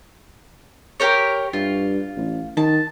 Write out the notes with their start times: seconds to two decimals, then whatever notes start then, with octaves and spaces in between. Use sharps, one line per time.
1.00 G4 A#4 C#5
1.53 G2 F4
2.17 A1
2.57 D#3 A5